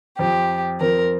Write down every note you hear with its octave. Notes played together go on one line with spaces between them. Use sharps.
F2 F3 C4 G4
F2 F3 C4 A#4